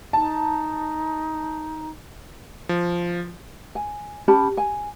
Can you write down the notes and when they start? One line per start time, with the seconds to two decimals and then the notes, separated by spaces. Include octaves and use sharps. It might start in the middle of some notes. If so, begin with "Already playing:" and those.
0.13 D#4 A5
2.69 F3
3.75 G#5
4.28 C#4 G4 A5 B5
4.57 G#5